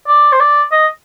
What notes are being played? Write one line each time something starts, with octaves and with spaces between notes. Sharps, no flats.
D5
C5
D5
D#5